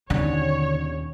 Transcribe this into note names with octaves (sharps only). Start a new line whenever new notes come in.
D#2 B2 D3 D#3 C#4 D4 C#5